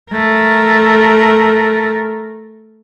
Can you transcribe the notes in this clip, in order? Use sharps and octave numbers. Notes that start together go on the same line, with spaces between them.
A3 A#4